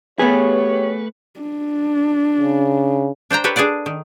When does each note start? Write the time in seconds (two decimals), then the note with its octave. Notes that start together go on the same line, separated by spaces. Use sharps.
0.19 A3 B3 G4 G#4 B4 C#5
1.40 D4
2.38 C#3
3.30 D4 C5 G5 A#5
3.44 G4 A4 B4 C#5 F#5
3.56 D4 G#4 A4 D5 F#5
3.86 D#3